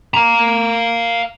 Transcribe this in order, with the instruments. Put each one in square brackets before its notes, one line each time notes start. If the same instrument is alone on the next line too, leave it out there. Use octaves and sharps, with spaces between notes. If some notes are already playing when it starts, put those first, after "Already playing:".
[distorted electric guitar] F5 A#5